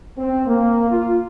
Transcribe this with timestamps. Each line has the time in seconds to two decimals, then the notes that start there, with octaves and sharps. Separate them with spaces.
0.18 C4
0.47 A#3
0.90 F4